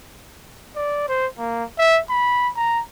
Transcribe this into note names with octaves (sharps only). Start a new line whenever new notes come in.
D5
C5
A#3
E5
B5
A#5